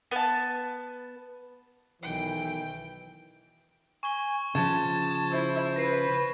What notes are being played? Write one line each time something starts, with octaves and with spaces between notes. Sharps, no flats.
B3 A5
B1 D#3 E3 G5
G#5 C#6 G7
C#3 F3 A5 G#6 E7
E4 C5
B4 A#6 C7